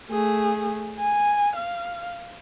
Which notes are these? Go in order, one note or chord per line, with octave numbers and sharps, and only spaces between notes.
A3 G#4
G#5
F5